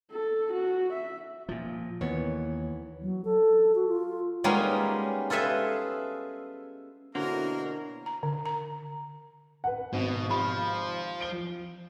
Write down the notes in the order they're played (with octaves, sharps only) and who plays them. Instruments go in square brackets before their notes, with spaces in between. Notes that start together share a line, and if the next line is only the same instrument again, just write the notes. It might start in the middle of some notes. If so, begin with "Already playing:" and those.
[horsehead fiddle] A4
F#4
E5
[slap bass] A#2 F3
[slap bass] D#2 [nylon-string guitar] E3 B3 C#5
[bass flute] F#3
A4
F#4
F4
[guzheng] G3 G#3 A#3 B3 C#4 D#4
F4 G#4 A4 B4 E5
[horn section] B2 A#3 [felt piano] D3 E4 [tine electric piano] F#4 C5 C#5 [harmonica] A#4
[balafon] A#5
D3
A#5
[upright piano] B4 F#5
[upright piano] G#1 [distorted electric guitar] B2
[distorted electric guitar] F3 [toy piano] G4 B5
[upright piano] D7 G7